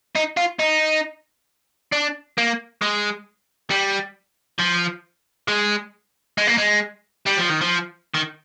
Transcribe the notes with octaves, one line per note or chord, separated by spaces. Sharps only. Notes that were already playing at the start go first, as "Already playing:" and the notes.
D#4
F4
D#4
D4
A#3
G#3
G3
F3
G#3
G#3
A#3
G#3
G3
F3
D#3
F3
D#3